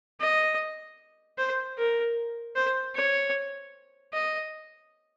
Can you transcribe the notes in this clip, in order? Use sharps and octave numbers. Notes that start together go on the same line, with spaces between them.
D#5
C5
A#4
C5
C#5
D#5